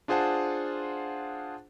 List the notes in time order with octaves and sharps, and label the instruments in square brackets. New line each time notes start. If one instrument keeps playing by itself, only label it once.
[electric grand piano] D4 F4 G#4 C5 F#5 A5